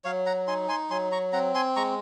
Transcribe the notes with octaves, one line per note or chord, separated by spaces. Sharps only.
F#3 C#5 F5
F#5 A#5
D#4 G#5 C6
G#5 C6
F#3 G#5 C6
A#5 C#6
C4 F#5 A#5
G#5 C6
G#3 A#5 C#6